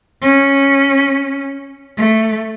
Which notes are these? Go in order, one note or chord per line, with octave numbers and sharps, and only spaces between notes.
C#4
A3